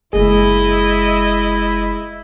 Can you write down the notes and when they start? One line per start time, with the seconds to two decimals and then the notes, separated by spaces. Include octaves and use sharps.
0.13 F#1 G#3 E4 G#4 D#5